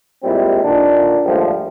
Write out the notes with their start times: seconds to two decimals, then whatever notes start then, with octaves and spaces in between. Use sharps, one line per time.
0.24 A#2 G3 G#3 C4 E4
0.62 A#2 D3 D#3 D4
1.24 D#2 G#2 F3 G3 A3